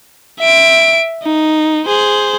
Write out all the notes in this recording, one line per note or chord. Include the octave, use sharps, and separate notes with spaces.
E5 D7
D#4
G#4 C5